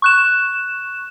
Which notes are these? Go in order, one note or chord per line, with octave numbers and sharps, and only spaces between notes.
C#6 F#6 E7